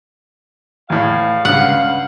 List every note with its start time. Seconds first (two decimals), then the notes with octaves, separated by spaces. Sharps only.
0.90 E2 A2 F5
1.45 C#2 G2 F#5